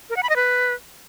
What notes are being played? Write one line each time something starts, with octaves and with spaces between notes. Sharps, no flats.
A#4
F#5
B5
D#5
B4